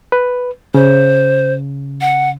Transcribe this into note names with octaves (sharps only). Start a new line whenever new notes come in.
B4
C#3 C5
F#5